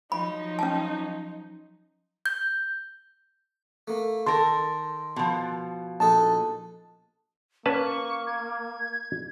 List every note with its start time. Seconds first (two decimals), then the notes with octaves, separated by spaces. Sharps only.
0.12 F3 F#3 D#4 B5
0.59 C#4 A5
2.26 G6
3.88 A3 A#3
4.27 D#3 A4 A#4 C6
5.16 B2 F3
6.00 A#1 D#4 A4 A5
7.66 A#3 C#4 B4 A5 C#6
8.27 G#6